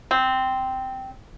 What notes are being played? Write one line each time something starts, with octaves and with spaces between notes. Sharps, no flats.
C4